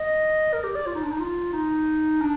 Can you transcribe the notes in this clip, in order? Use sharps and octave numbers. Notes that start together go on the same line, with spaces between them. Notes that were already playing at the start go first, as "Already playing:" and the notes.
Already playing: D#5
A#4
G4
D5
F4
D#4
D4
D#4
F4
D#4
D4